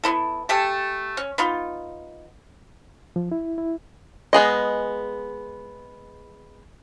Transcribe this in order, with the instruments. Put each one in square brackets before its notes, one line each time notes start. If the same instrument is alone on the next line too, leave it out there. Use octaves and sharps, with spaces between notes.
[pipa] B3 E4 A4
A3 G4 A4 G#5
C#4
B3 D#4 F4
[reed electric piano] F3
E4
E4
[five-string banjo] G#3 B3 G#4 D#5